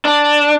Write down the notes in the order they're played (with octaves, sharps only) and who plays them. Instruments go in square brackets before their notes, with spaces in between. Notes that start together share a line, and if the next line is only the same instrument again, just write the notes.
[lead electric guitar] D4